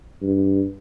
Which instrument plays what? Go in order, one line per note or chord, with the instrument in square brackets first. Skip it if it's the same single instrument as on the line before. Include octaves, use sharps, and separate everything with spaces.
[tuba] G2